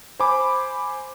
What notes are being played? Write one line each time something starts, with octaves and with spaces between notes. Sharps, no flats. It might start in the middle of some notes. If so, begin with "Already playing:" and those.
C5 G#5 B5 D6